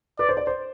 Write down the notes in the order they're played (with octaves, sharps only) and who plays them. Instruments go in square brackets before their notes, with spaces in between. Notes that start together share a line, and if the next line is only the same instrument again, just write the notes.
[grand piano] B4 [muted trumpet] D5
[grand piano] C5
D5
C5